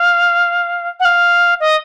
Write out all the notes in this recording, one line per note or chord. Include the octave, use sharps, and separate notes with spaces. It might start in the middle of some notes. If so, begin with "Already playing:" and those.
Already playing: F5
F#5
F5
D#5